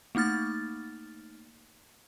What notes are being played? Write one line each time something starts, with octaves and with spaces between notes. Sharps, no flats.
A3 A#3 D#4 F6 A6